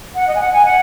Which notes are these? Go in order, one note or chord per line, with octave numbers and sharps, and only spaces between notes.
F#5
D#5
G#5
F#5
G#5
F#5